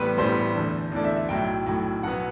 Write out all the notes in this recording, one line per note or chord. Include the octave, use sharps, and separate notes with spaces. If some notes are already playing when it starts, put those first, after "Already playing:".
Already playing: A1 A2 G3 B3 B4 C5
A1 A2 G3 B3 C5
E2 D3 A3
E2 D3 A3 D5
E5
E5
B1 A2 F#3 G5
B1 A2 F#3
B1 B2 F#3 B3 F#5